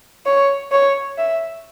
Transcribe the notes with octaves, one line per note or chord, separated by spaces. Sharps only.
C#5
C#5
E5